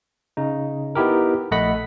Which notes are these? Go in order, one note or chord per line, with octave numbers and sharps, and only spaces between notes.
C#3 D#4
B3 D#4 E4 G4 A#4
A#1 A3 D#5 F#5 B5 B6